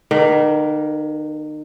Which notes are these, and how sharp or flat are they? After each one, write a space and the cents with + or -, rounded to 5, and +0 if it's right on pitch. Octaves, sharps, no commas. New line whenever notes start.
D#3 -35 A#3 +0 A#4 +40